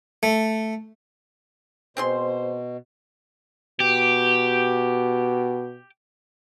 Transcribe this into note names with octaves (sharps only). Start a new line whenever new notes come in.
A3
B2 C4 G#4 C5 C6
B2 G4